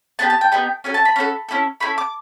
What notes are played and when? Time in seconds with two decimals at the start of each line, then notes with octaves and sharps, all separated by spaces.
0.19 B3 D#4 G4 A5
0.30 A5
0.41 G5
0.52 B3 D#4 G4
0.84 C#4 F#4 A4 G#5
0.94 A5
1.05 B5
1.16 C#4 F#4 A4
1.49 C#4 E4 A4
1.80 C#4 E4 A4 B5
1.98 D6